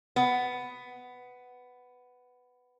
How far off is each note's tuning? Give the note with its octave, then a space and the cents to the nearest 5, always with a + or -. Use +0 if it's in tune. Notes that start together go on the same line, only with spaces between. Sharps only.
B3 +10